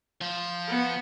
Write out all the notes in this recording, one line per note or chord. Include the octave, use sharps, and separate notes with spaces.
F3 F4
B3